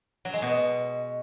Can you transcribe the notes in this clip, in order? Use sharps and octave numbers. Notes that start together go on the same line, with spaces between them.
F#3
G#3
B2